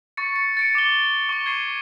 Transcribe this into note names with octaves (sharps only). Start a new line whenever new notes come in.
C#6 A6 C#7
C#7
A6 C#7 D7
D6 G7
C#6 G7
G#6 C7 D#7